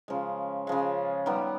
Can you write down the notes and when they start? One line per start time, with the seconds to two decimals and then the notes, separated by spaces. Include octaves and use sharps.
0.08 C#3 F3 G#3
0.67 C#3 F3 G#3
1.26 D#3 G3 B3